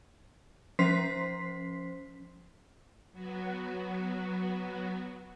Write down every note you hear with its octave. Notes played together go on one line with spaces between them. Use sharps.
F3 C#4 C5 C6 B6 C7
F#3 B3 F#4